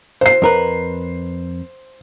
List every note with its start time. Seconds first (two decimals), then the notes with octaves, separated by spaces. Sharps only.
0.21 C5 C7
0.42 F2 A#4 B4